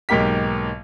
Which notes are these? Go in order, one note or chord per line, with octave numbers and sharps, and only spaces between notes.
B1 G#2 A#3 G4 B6